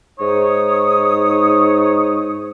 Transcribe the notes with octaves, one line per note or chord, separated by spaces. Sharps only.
G#2 D#4 C#5 D#6